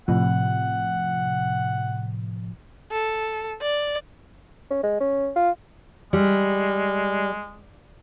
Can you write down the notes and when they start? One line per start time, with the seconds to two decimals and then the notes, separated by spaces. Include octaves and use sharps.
0.08 A2 C3 F3 F#5
2.91 A4
3.62 D5
4.71 C#4
4.83 G#3
5.00 C#4
5.36 F4
6.13 G3 G#3